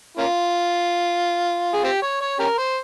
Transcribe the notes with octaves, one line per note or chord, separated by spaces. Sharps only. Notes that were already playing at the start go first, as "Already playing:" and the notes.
A#3 C#4 F4
G#4
C4 G4
C#5
C#5
C#4 G4 A#4
C5